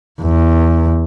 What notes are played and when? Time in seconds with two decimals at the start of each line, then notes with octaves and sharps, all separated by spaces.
0.21 E2